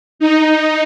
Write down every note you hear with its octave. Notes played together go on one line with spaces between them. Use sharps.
D#4